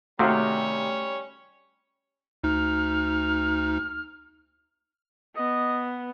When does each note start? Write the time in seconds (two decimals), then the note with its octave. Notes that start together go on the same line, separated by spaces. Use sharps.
0.19 C3 D#3 G3 A3 C#4 F#4 C#5 F5
2.44 D2 D#4 F6
5.37 B3 D#5